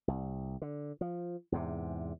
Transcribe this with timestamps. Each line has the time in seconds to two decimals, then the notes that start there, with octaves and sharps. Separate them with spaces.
0.08 C2
0.62 D3
1.01 F3
1.52 E2 G#2 C3